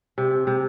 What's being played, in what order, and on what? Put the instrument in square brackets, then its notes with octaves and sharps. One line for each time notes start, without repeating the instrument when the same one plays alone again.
[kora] C3
C3